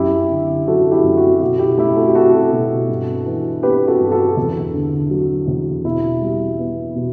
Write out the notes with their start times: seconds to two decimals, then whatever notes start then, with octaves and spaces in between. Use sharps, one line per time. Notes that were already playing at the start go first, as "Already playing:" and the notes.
Already playing: F#2 E4 G4
0.31 D3
0.68 F#3 F#4 A4
0.91 E4 G4
1.04 F#2
1.17 F#4
1.41 B2 F#4
1.59 E4 G4
1.78 A3 E4 G4
1.96 F#4 A4
2.07 G4
2.15 C4 F#4 A4
2.52 B2
2.89 G2
3.26 E3
3.63 B3 G4 B4
3.87 F#4 A4
4.00 G2
4.12 F#4 A4
4.37 E2
4.74 D3
5.10 F#3
5.48 E2
5.84 B2 E4
6.22 G3
6.59 B3
6.96 B2